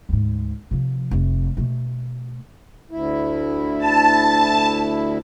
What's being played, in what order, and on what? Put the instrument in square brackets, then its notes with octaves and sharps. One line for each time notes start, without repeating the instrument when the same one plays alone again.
[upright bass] D2 G#2
C3 F3
F1 A3
B2 A3
[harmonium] D2 E4
[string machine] A5